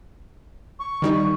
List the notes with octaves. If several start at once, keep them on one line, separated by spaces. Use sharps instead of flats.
C#6
D#3 G3 D#4